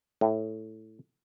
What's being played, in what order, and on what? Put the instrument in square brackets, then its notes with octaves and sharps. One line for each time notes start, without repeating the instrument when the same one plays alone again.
[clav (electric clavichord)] A2